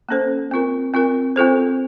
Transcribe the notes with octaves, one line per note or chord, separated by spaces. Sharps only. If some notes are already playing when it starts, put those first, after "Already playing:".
A#3 C#4 A4 C5
C4 F4 A#4
C4 F4 A#4
C4 F4 A4 C5